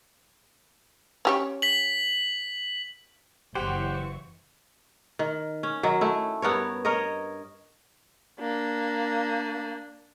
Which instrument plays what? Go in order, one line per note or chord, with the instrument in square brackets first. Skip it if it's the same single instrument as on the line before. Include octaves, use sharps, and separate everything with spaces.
[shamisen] C#4 G4 C#5
[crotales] B6 F#7
[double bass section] F#1 [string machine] E3 C#6 [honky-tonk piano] G4 F#5 [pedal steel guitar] C5
[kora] D#3
C#4
D#3 F#3
A3 E4
G2 B3 A#4 C#5
A#4 C#5 D#5
[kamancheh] A#3 D4